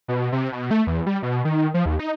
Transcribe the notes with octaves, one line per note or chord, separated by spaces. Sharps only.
B2
C3
B2
A3
E2
G3
B2
D#3
F3
D#2
D#4